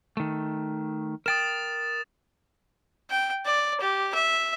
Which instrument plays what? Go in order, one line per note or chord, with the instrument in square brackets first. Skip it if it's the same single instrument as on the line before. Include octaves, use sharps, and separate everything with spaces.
[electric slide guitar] D#3 A3
[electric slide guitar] A#4 G5 [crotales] D#6 A6 E7
[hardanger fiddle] G5
D5
G4
E5